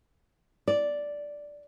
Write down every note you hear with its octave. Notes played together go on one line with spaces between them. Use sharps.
D5